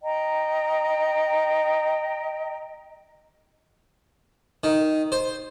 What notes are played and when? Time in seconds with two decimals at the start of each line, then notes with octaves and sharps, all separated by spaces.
0.02 D#5 G5 A#5
4.64 D#3
5.12 C5